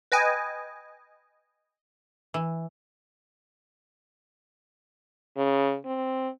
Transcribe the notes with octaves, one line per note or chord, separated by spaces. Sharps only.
B4 D#5 G5 G#5
E3
C#3
C4